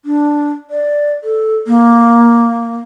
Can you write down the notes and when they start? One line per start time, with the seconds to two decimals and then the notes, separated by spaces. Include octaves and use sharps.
0.05 D4
0.70 D5
1.24 A4
1.67 A#3